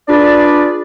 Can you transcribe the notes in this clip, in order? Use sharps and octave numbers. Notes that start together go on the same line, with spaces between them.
D4 F4 G#4 B4 D5